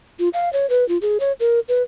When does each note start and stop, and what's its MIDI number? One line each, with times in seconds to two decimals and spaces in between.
0.19 0.29 65
0.33 0.52 77
0.53 0.69 73
0.70 0.87 71
0.89 0.98 65
1.02 1.18 68
1.20 1.32 73
1.40 1.60 70
1.68 1.82 71